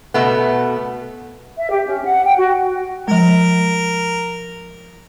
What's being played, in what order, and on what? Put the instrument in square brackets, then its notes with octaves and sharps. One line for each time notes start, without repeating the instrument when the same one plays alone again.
[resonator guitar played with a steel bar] B2 A3 B3
[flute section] E5
G4
C#4
F#5
G5
F#4
[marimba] F3 G#3 [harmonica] A#4